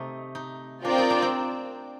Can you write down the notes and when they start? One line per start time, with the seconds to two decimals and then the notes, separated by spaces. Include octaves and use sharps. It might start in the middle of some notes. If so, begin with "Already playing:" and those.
Already playing: C3 A3 D#4
0.35 D#4
0.85 C4 D4 F4 A#4 D5 G5
0.98 D#4
1.10 D4
1.22 C4